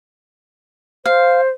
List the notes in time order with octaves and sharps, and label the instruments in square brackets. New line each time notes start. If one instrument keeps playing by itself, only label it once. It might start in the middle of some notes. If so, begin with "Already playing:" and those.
[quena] C5 [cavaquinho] F5